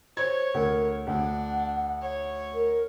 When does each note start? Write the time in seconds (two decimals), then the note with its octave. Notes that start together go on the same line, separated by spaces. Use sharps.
0.17 C5 C#5 G#6
0.54 D2 A#4
1.07 D2 D4 F#5
2.01 C#5
2.54 A#4